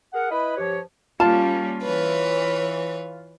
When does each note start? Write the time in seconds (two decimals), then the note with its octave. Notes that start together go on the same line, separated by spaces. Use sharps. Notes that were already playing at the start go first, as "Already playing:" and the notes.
0.14 G#4 A#4 F#5
0.30 E4 B4 D#5 B5
0.57 G2 F3 G4 C#5
1.20 G3 A#3 C#4 F4 A5
1.83 E3 B4 C#5